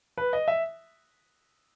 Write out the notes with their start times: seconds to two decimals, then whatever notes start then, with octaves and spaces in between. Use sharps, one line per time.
0.18 B4
0.33 D#5
0.48 E5